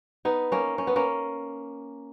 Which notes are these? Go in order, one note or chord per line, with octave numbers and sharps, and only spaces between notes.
B3 D#4
A#3 C#4
C#4
B3
A#3 C#4